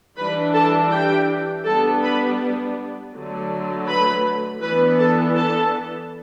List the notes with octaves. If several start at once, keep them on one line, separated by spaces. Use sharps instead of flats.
E3 G3 D4 B4 B5
A4 A5
G4 G5
G3 B3 D4 A4 A5
B4 B5
D3 F#3 A3
B4 B5
E3 B3 D4 B4 B5
A4 A5
A4 A5